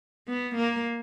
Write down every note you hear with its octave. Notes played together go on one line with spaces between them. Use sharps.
B3
A#3